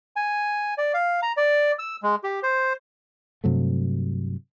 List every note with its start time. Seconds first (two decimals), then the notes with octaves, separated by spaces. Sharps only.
0.16 G#5
0.78 D5
0.94 F5
1.23 A#5
1.37 D5
1.79 E6
2.03 G#3
2.24 G4
2.43 C5
3.44 G2 C3 F#3 A3